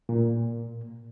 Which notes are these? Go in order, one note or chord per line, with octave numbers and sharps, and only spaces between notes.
A#2